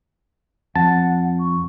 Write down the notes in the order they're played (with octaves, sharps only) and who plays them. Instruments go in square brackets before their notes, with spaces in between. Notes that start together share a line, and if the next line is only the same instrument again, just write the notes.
[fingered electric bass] F2 [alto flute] F#5 [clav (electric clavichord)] A5
[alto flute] C#6